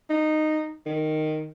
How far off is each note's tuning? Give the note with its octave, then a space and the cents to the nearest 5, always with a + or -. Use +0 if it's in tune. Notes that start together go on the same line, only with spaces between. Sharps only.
D#4 -10
D#3 -5